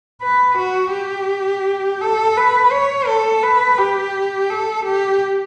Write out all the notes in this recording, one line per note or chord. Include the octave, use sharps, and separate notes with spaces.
B4
F#4
G4
A4
B4
C#5
A4
B4
G4
A4
G4